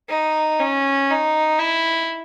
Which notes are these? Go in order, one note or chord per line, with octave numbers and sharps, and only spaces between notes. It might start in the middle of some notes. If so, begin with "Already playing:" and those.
D#4
C#4
D#4
E4